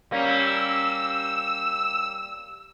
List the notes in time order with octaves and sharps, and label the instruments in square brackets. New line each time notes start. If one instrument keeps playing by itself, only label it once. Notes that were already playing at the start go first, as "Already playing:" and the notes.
[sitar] G3 A#3 C#4 [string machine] E6